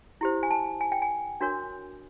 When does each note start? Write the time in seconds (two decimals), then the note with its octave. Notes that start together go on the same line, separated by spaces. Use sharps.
0.21 E4 G4 C5
0.43 G#5
0.51 A5
0.81 G#5
0.92 G5
1.02 G#5
1.41 D4 F#4 A#4 C#5